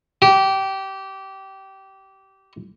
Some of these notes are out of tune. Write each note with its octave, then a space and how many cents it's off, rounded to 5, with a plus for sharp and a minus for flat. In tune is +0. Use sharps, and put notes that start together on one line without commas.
G4 -20